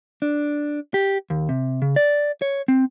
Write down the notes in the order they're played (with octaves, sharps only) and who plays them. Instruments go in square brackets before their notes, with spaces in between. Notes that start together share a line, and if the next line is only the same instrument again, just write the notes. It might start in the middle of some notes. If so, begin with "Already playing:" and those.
[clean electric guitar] D4
G4
D#2
C3
C#3
D5
C#5
C4